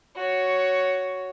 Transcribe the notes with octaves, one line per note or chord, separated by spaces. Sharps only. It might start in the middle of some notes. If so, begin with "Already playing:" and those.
F#4 C#5